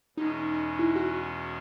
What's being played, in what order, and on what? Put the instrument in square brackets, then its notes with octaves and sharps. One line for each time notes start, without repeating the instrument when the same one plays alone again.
[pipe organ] E2 B2 G#3 C#4 [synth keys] D#4
[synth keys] E4
F#4